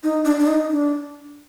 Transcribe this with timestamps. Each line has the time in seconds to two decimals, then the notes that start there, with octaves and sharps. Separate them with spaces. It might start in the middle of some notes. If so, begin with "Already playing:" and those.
0.03 D#4
0.25 D4
0.40 D4
0.47 D#4
0.70 D4